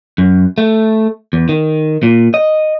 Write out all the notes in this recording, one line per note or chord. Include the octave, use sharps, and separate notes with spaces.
F#2
A3
E2
D#3
A#2
D#5